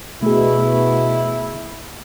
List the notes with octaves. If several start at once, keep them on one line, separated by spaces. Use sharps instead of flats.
B2 A3 E4 G#4